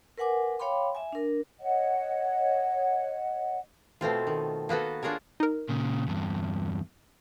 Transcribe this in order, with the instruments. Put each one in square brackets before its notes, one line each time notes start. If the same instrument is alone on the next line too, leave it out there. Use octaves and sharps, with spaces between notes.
[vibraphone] A#4 B4 F#5 G#5 D6
C#5 F5 G5 B5 C6 D6
E5 G#5
D4 A#4
[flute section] C#5 D#5 F#5
[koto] B2 A3 C4 F4
D#3
A#3 B3 F#4 A4
D4 F4 G#4 A#4 C#5
[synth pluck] D#4 A#4
[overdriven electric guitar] A#2 C#3
E2 G2